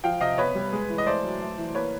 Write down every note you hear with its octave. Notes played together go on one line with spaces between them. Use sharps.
F3 F5 G5
C3 D#5 F5
B3 B4 C#5
G3
G#3
E3
D#5
A3 C5 D5
F#3
A3
E3
A#3 B4 C#5